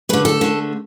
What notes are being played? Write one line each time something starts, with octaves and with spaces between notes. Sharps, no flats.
D3 A3 B4
A4
D3 A3